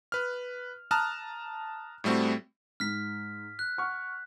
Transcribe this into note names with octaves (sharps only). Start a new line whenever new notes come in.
B4 F6
A5 A#5 D#6 F6 F#6
A2 G3 A3 C4 F#4
G#2 F6 B6
F#6
F#5 C#6 F6